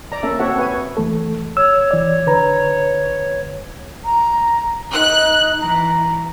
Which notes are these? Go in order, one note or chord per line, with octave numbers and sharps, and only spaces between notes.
D5 A#5
A#3 C#4 A4 E5
C4 F#4 A4 C#5 E5 F#5
B4 C#5 G#5
E3 A3 A4
C#5 E6
E3 D5
D3 B4 A#5
A#5
D#4 F#6
E3 A#5